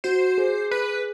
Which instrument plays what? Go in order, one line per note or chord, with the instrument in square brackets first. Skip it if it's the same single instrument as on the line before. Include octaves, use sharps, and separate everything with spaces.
[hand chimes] F#4 [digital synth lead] C5
[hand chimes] G#4
[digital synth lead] B4